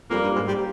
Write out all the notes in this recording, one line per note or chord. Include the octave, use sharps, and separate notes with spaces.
F2 G3 A#3
G2
G#2
G3